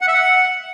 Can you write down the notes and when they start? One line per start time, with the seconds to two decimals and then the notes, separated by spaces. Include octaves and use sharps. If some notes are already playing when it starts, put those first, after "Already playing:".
0.01 F#5
0.08 E5
0.14 F#5